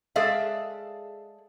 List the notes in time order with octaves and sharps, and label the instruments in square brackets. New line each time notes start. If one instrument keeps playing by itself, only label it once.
[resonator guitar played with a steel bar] G#3 G#4 A4 D5 E5 F5